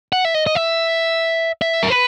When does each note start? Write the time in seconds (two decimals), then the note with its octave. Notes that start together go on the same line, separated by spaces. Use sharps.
0.12 F#5
0.25 E5
0.34 D#5
0.47 D#5
0.55 E5
1.62 E5
1.83 A#4
1.90 B4